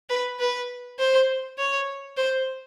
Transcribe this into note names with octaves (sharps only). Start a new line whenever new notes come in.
B4
B4
C5
C#5
C5